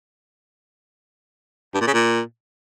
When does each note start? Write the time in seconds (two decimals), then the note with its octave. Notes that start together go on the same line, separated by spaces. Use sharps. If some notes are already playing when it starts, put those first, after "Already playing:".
1.75 G2
1.81 A#2
1.87 C#3
1.94 A#2